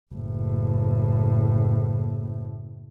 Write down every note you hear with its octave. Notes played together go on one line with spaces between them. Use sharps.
F#1 A2